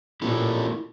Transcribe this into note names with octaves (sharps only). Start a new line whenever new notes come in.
A#2 E4 G4 A4